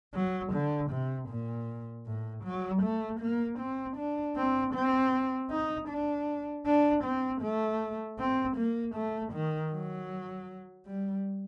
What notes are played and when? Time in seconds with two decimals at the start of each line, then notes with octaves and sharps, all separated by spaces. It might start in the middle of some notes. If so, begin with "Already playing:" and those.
0.14 F#3
0.53 D3
0.91 C3
1.29 A#2
2.06 A2
2.44 F#3
2.82 A3
3.20 A#3
3.59 C4
3.97 D4
4.36 C4
4.74 C4
5.51 D#4
5.89 D4
6.65 D4
7.04 C4
7.42 A3
8.19 C4
8.57 A#3
8.95 A3
9.33 D#3
9.72 F#3
10.86 G3